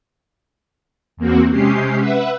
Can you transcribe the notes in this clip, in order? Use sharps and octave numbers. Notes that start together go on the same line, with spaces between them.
E2 A#3 C4 F#4
C3 G#3 C#4 G4 C7
B4 E5 F#5